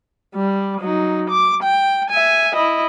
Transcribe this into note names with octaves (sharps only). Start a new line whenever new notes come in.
G3
F#3 D#4
D6
G5
E5 G#5
E4 D#5